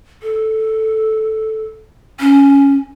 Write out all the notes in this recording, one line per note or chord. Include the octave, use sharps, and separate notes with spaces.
A4
C#4